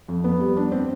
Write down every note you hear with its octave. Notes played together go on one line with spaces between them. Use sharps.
F2
B3
G3
D4
C4